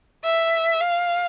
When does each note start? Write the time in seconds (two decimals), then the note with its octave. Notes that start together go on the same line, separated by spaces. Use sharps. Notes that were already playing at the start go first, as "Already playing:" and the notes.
0.25 E5
0.81 F5